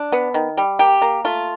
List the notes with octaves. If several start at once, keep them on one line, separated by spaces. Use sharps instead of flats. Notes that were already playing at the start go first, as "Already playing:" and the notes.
Already playing: D4
B3
D#3
G3
A#3 G4
A#3
A3 F4